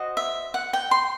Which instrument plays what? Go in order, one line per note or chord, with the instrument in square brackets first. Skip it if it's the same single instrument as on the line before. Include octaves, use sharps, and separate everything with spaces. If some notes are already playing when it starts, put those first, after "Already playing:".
Already playing: [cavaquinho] F#4 C5 D#5
E5
F#5
G5
C6